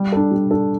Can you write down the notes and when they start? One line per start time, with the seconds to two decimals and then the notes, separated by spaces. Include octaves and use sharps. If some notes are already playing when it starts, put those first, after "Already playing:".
Already playing: G3
0.12 D4 A4
0.31 G3
0.51 D4 A4